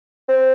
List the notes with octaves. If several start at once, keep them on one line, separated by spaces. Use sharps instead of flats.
C4